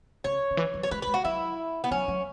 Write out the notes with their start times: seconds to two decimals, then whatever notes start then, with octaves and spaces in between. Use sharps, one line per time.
0.24 C#3 C#5
0.51 C#3
0.57 E3
0.74 F#3
0.83 C#5
0.91 G#3 B4
1.02 B4
1.07 G#3
1.14 F#4
1.25 F#3 E4
1.84 B3
1.91 F#3 C#4
2.08 F#3